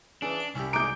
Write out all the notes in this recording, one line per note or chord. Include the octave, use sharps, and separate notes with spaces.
C#3 E3 D4
A5
C2 C#4 E4 G4
G#3 D#4 A#5 D6 G6 D7